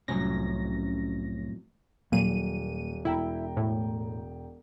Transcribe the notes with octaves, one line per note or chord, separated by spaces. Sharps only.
C2 F2 A2 F#3 C#4 A#6
D#1 A#2 F#3 A#3 D#7
E1 E4 G5 A#5
A2